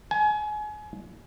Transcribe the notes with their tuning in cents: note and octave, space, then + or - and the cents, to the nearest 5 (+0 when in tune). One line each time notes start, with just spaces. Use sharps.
G#5 +30